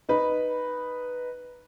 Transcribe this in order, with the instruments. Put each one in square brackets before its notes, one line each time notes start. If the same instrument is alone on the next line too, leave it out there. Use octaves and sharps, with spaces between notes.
[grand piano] D#4 B4